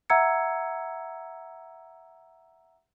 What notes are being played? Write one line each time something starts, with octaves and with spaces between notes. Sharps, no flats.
E5 F#5 A#5 E6 G#6 C#7